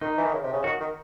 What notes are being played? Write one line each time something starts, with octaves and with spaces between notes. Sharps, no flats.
D#3 D#4
E3
D#3
C#3
C3
C#3
D#3 F#4
D#3